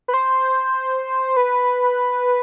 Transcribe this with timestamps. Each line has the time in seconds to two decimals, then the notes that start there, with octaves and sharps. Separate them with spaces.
0.08 B4
0.14 C5
1.37 B4